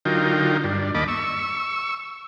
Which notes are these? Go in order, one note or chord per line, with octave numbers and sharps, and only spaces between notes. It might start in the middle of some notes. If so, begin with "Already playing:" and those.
D3 F#3 D#4 F4 A#4 G5
G2 D4
D#2 A#3 D#5 A5 B5 D6
C#6 E6